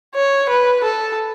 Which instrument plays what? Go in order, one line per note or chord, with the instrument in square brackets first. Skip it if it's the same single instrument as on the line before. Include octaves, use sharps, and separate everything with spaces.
[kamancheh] C#5
B4
A4